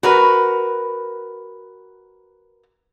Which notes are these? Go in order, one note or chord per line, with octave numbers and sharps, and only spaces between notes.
F#4 A#4 B4